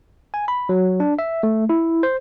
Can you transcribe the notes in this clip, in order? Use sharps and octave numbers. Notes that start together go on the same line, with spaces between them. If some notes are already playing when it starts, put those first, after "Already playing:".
G#5
B5
F#3
D4
E5
A3
E4
C5